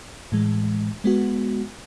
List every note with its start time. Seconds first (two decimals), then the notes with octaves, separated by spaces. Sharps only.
0.32 A2 E3 G#3
1.04 G#3 B3 F#4